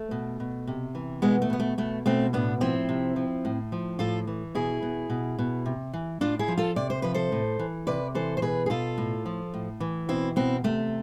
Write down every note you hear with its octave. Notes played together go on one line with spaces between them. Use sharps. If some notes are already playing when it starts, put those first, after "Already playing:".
Already playing: A3
B2
B2
C3
E3
B2 G#3 B3
A3
B2 B3
A3
B2 A3
B2 A3 C4
A2 B3 D4
F3 C4 E4
C3
F3
A2
F3
A2 F4 A4
E3
B2 E4 G#4
B2
B2
B2
C3
E3
A2 D4 F4
E4 G#4
F3
F4 A4
C3 D5
C5
F3 B4
A4 C5
A2
E3
C3 B4 D5
E3 A4 C5
C5
B2 G#4 B4
G#4
B2 F4 A4
A2
F3
A2
E3
B2 C4 E4
B2 C4 E4
C3 A3